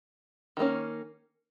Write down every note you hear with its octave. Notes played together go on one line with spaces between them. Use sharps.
D#3 G3 A#3 C#4